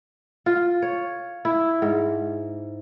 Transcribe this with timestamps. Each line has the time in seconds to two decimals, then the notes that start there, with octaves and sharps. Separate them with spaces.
0.46 F4
0.82 C#5
1.45 E4
1.82 G#2